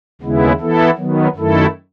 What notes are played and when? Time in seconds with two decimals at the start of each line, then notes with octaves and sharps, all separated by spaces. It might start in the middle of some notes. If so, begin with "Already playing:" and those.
0.22 D#2 C#3 G#3 B3 E4
0.60 E3 B3 E4 A4
0.97 D#3 F#3 B3
1.35 F#2 D#3 A3 E4 A4